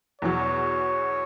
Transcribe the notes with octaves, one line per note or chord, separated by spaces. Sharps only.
E2 B2 F#3 C#5